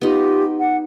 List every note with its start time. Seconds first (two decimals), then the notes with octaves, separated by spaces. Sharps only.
0.01 B3 D#4 F4 G4
0.58 F#5